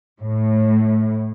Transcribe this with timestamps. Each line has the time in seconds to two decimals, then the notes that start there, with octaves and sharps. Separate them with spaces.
0.21 A2